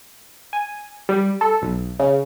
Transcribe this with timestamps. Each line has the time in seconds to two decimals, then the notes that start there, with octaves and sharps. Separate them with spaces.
0.53 G#5
1.09 G3
1.41 A4
1.62 B1
1.99 C#3